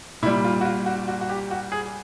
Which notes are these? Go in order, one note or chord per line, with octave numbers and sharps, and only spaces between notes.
A#2 G3 E4
F4
F#4
F4
F#4
F#4
F#4
G4
F#4
G#4